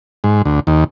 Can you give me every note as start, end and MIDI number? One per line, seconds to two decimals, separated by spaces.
0.24 0.42 44
0.45 0.60 38
0.67 0.84 39